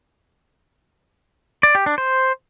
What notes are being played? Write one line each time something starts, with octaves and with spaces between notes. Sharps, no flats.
D5
G4
D4
C5